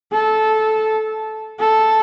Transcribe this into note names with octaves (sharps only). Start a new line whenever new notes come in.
A4
A4